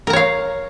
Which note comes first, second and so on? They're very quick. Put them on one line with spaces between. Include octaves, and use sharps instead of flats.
A#4 A#5 C#5 F5